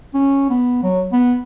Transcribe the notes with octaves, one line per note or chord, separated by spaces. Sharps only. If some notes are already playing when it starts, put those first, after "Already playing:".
C#4
B3
F#3
B3